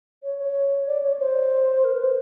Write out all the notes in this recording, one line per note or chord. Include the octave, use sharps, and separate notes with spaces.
C#5
C#5
D5
C#5
C5
A#4
B4
C5